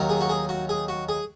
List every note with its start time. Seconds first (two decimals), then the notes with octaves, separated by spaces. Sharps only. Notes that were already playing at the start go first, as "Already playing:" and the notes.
Already playing: D#2 D#3 F#3 A#3
0.09 G#4
0.21 F#4
0.29 G#4
0.49 F#4
0.69 G#4
0.88 F#4
1.09 G#4